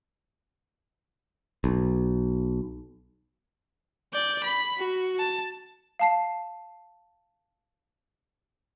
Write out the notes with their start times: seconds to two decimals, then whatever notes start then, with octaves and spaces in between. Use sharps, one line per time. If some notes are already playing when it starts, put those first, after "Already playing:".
1.64 B1
4.13 D5 G6
4.43 B5
4.78 F#4
5.19 A5
5.99 F5 A5 C7